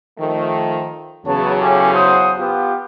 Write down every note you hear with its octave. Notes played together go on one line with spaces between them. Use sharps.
D#3 F3 A3
E2 C#3 F#3 B3 C#5 A5
C#4 G4 A4
C5 F#5 D#6
B3 F4 G4